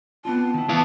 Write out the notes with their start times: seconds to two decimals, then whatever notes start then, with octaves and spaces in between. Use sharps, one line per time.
0.25 B3 C4 F4 A5
0.54 D#3 E4
0.69 E3 B3 F5